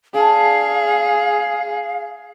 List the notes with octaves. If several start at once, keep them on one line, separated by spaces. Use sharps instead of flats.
D4 G#4 F5